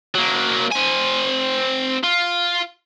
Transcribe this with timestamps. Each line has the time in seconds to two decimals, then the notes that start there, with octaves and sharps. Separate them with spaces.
0.15 F#3 A#3
0.72 C4 G#5
2.04 F4